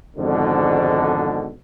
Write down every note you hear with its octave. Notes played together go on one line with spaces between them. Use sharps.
G#1 F2 G#2 B2 D3